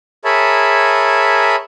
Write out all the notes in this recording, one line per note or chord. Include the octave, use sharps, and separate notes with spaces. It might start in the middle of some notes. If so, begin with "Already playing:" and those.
G#4 A#4 C#5 E5 A5 B5